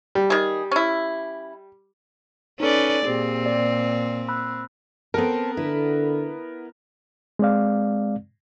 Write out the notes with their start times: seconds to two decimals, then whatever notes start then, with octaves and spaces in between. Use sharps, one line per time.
0.15 G3
0.30 D#3 G#4
0.71 C#4 E4
2.60 C#4 D#4 A4 B4 D5
3.05 A#2 C4 G4 G#4
3.46 D5
4.28 B5 E6 F#6
5.14 B3 C4 A4 A#4
5.57 D3 E4 B4
7.39 G#3 C4 D5 F5